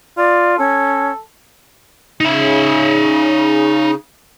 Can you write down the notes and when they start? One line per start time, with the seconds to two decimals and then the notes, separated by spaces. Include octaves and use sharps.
0.17 F4 D5
0.58 C#4 A4
2.21 C#3 D#4 E5